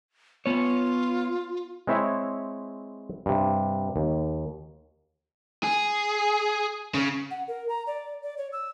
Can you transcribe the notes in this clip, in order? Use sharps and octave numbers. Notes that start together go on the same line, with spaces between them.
B3 F4 C#5
G#3 C4 E4 C#5 E5
G2 C3
D#2
G#4
C#3
F#5
A#4
A#5
D5
D5
C#5
E6